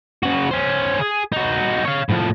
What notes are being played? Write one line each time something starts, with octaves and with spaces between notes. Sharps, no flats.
C#3 F#4
C#4 C5
G#4
D#4 F#4
C#5 F5
A2 F3